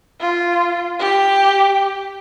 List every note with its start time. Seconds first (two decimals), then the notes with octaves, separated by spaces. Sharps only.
0.21 F4
0.99 G4